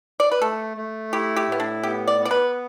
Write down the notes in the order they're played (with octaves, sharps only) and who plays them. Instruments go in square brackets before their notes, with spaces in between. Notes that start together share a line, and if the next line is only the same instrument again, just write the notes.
[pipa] D5
B4
[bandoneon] A3 [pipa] A4
[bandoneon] A3
[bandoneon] E4 [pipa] G4
[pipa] G4
[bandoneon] A2 [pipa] B3
[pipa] D4
[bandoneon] B3 [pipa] G4
[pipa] D5
[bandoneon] B3
[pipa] D5
B4